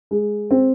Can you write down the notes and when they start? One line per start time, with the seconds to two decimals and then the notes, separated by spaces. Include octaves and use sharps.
0.11 G#3
0.51 C4